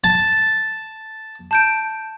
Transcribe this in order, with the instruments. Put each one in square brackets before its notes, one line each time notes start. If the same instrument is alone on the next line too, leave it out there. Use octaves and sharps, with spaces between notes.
[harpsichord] A5
[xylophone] A5 G6 D7